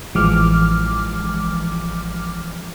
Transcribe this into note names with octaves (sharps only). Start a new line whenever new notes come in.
A1 E3 F3 G#3 D6 F6